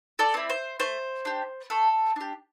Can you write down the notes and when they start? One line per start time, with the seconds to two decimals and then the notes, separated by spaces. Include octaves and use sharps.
0.19 A4 D5
0.34 C4 E4
0.49 C5
0.80 A3 C5
1.25 D4 G4
1.70 A3 A4
2.16 D4 G4